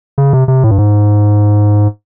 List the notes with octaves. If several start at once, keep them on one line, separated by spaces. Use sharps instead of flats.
C#3
C3
C3
A2
G2
G#2